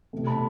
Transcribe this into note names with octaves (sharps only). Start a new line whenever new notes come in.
C3 E3 A3
A5 B5